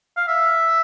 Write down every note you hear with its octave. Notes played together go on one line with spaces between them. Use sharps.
F5
E5